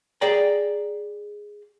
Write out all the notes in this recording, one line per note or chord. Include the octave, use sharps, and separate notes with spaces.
G#4 D5 G5 A#5